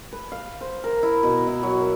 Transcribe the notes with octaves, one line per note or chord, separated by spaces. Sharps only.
B4
F5
C5
A#4
E4
B2
E4
F#3
A#4